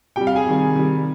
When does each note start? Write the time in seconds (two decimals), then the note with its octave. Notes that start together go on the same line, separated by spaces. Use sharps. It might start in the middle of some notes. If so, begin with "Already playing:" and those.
0.16 C3 G4 G5
0.21 G3
0.27 F5
0.36 G#4 G#5
0.46 C3 D#3 G3
0.75 C3 D#3 G3